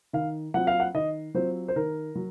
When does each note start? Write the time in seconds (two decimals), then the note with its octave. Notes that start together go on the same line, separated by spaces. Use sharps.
0.13 D#3 F5
0.54 F#3 C4 F4 F#5
0.67 F5
0.80 F#5
0.94 D#3 D#5
1.34 F#3 C4 F4 C5
1.68 C5
1.76 D#3 A#4
2.15 F#3